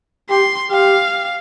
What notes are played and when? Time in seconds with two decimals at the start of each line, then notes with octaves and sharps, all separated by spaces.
0.30 G4 C6
0.71 G4 F5